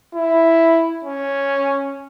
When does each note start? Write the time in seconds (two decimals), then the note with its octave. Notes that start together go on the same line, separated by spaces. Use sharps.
0.15 E4
1.05 C#4